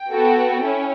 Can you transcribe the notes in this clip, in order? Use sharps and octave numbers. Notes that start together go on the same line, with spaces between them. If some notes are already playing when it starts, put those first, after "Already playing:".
Already playing: G5
B3 F#4 A4
C#4 E4